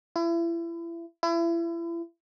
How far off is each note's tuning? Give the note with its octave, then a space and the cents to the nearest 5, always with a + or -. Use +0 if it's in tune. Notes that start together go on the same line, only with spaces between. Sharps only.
E4 +30
E4 +35